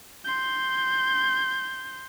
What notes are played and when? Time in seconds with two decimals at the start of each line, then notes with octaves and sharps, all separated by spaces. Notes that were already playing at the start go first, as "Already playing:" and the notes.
0.25 C6 G6